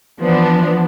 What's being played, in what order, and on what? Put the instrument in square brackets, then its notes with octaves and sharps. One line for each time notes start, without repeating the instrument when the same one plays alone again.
[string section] E3 F3 B3 D4